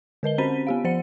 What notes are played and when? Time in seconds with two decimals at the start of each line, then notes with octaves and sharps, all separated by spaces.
0.23 D3 A#4 D#5 G7
0.38 C4 C#4 C5 B5 B6 D#7
0.67 B3 G4 F5
0.84 F3 C5 F#5 C#7